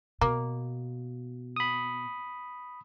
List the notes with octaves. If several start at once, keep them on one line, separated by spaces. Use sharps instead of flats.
B2 A#3
B5 D#6